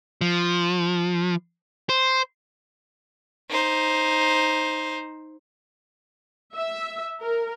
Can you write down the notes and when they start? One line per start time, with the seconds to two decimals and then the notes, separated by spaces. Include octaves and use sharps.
0.21 F3
1.89 C5
3.49 D#4 C5
6.54 E5
7.19 A#4